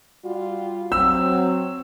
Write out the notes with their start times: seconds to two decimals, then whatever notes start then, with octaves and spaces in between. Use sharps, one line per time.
0.24 G3 F4 F#4
0.92 F#3 C4 E6